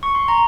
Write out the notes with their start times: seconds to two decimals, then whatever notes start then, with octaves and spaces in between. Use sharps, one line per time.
0.03 C#6
0.15 C6
0.28 A#5